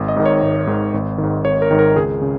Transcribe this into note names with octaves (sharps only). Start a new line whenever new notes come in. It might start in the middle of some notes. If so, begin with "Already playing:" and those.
Already playing: G#1
D#5
G#2 D#3
C#5
G#1
G#2 D#3
G#1
D#3
G#2
G#1 C#5
A#4
G#2 D#3
A#4
C#2 G#4
C#3